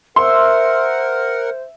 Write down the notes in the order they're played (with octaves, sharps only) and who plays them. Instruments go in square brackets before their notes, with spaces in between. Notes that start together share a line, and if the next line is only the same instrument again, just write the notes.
[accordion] A#4 F#5 [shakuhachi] C5 [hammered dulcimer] E5 [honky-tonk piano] C6